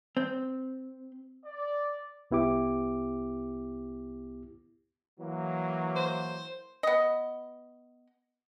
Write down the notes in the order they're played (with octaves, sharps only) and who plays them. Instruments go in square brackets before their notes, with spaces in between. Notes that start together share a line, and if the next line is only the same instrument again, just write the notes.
[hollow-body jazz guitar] C4
[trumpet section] D5
[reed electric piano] C2 B3 E4 G4 D6
[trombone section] E3 F#3 A#3
[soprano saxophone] C5
[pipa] B3 D#5